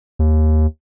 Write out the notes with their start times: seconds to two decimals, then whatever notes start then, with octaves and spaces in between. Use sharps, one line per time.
0.19 D#2